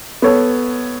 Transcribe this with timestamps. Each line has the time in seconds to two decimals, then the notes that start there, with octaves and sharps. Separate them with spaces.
0.22 B3 A4 C#5